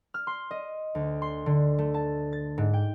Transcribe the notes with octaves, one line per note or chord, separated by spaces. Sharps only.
F6
C6
D#5
D2
C6
D3
A3
A5
A6
G#2
G5